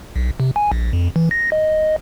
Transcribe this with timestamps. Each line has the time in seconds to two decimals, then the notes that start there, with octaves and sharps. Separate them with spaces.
0.16 B1
0.40 C3
0.56 G#5
0.72 A#1
0.93 F2
1.16 E3
1.31 A#6
1.52 D#5